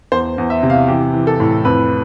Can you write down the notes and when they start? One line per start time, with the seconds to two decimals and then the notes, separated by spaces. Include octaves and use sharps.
0.12 E2 C5
0.38 E2
0.50 E5
0.63 C3
0.70 F5
0.88 E3 G4
1.13 E3
1.27 A4
1.40 A2
1.65 F2 B4